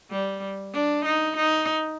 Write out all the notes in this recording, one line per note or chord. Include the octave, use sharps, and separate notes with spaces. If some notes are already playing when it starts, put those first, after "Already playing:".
G3
D4
D#4
D#4